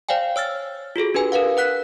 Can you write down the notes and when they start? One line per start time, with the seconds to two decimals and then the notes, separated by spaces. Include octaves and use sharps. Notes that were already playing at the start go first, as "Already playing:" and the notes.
0.09 C5 D5 F5 G5 G#5
0.36 C#5 E6 F6 A6
0.96 F4 F#4 G#4 A4
1.14 D4 G4 B4 G#5
1.32 A#4 B4 F5 F#5
1.57 B4 F#5 F#6 B6